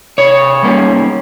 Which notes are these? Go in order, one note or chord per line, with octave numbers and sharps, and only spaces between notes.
C3 C#5
G3 A#3 C#4